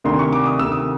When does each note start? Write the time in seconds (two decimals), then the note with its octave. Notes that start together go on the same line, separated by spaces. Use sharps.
0.04 D2 C3 D#3 C6
0.19 C#6
0.33 D6
0.46 D#6
0.59 D2 C3 D#3 E6
0.72 D#6